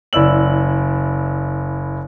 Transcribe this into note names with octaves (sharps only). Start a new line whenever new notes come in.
F#1 E4 D5 E6 F#7